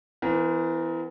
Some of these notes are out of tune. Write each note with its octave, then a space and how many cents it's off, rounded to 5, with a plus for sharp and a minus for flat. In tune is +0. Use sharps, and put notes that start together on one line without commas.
E3 +10 B3 +45 A#4 +15